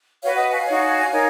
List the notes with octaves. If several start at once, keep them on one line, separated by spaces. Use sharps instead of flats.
F#4 B4 C#5 F5
D#5 F#5
F5 G#5
D#4 F#4 C#5
D#4 A#4 C#5